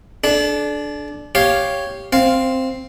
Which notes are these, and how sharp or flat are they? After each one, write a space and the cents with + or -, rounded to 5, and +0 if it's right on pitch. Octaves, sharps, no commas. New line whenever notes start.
D4 +0 A4 -40
G4 +0 C#5 +0 F5 +0
C4 +0 F5 +0